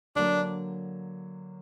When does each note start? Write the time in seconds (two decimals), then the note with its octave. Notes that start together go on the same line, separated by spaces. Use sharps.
0.16 D3 F#3 A#3 D4